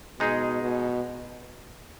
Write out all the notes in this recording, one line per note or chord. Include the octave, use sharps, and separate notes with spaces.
B2 G#3 D#4 G#4 D#5
B2